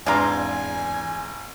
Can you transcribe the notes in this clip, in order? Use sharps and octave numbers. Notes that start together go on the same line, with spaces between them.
G#1 E2 D4 F4 G#5 A#5